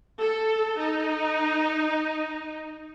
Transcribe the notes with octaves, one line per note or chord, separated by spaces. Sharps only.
A4
D#4